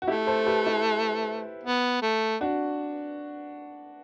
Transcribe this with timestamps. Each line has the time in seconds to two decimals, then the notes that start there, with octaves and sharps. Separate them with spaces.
0.02 F#4
0.07 A3 E4 G4
0.27 A4 C5
0.46 G4 B4
0.66 E4 G4
1.63 B3
2.02 A3
2.41 D4 F#4